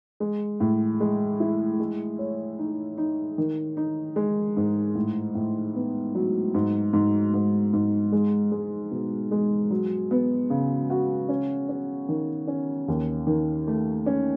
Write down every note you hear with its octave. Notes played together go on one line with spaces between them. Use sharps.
G#3
A2
G#3
E4
G#3
C#5
D#4
D#4
D#3
D#4
G#3
G#2
A2
A2
B3
F#3
G#2
G#2
G#2
G#2
G#3
G#3
B2
G#3
F#3
B3
C#3
F#4
C#4
C#4
D#3
C#4
D#2
D#3
A3
C#4